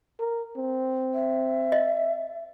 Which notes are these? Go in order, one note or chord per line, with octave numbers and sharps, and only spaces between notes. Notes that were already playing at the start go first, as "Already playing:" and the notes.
A#4
C4
E5
D#5